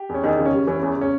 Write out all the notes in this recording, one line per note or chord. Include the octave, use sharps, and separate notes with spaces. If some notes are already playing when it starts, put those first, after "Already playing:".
Already playing: G4
E2
C#4
E2 D#3 D#4
C#3
C#4
G3
E3 C#4
E2 C#4
C#3 C#4